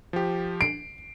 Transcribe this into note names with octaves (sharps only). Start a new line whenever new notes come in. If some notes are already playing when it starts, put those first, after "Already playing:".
F3 G4
C7 D7